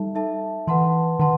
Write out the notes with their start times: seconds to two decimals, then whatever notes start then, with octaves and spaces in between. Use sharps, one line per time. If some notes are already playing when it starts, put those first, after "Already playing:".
Already playing: G3 D#4 A4 E5 A5
0.15 D#4 A4 E5 A5
0.67 E3 B4 F#5 A5 C6
1.19 D#3 B4 F#5 A5 C6